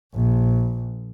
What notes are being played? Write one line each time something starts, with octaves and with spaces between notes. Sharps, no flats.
A#1